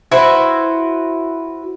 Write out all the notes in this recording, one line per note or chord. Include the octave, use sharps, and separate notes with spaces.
E4 F#4 B4 C5